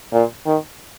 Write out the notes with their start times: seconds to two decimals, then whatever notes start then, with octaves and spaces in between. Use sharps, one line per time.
0.13 A#2
0.46 D#3